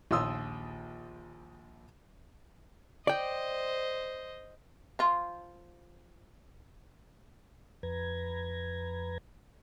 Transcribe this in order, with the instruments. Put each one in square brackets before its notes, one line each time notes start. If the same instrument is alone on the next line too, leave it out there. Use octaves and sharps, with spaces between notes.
[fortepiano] A#1 D#2 F4 C6 D#6 E6
[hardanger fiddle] C5 D#5 [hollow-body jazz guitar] D5 G5
[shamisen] F3 F4
[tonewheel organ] F2 B4 A#5 G#6